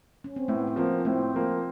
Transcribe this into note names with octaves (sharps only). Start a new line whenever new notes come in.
C#4
C4
A2 B3
B3
F3 A#3 C4
A2 C4
F3 A#3